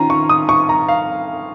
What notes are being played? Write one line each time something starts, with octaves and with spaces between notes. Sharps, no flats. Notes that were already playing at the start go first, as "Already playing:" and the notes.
Already playing: D#3 C#4 F4 A#5
C#6
D#6
C#6
A#5
F5